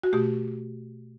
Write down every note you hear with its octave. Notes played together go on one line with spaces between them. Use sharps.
F#4
B2 A3 G4